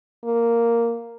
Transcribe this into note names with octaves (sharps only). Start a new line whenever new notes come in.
A#3